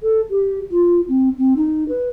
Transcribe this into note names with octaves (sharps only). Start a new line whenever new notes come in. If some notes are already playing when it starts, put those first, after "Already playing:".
A4
G4
F4
C4
C4
D#4
B4